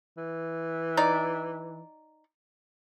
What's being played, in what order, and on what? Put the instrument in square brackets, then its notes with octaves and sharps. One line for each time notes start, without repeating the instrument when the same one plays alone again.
[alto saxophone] E3
[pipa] D#4 D5